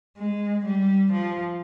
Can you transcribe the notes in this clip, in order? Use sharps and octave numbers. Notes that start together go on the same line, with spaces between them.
G#3
G3
F3